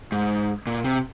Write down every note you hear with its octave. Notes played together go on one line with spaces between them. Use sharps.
G#2
A#2
C3